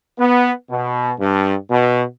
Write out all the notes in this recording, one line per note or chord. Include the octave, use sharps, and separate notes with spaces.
B3
B2
G2
B2